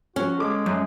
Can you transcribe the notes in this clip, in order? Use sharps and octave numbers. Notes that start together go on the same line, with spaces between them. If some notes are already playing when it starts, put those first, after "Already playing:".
F3 C#4 F#4
G#3 G#4 A4 D6
F#2